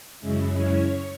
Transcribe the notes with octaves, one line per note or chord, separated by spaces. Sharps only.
F#2 C#3 G#3 C#4 E4
C#5